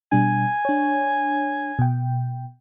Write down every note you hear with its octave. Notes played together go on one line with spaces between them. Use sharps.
B2 G3 D4 G#5
D4 C#5
B2 G5